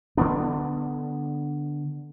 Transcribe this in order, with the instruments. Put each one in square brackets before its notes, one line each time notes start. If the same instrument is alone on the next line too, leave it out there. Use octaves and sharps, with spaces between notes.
[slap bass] D3 B3 D4